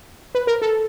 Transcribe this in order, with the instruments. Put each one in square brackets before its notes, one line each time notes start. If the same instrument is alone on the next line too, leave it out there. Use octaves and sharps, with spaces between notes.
[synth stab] B4
A#4
A4